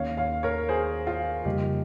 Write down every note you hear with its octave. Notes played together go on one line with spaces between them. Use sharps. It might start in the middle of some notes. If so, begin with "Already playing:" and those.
Already playing: D#2 D#3 A#3 C#4 C#5 F5
C#5 F5
A#4 C#5
G#4 C5
F4
F2 C#3 G3 A#3 D#4 G4